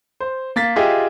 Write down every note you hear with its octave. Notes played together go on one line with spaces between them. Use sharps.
C5
A#3 A6 B6
F4 G4 G#4 D#5 E5 G5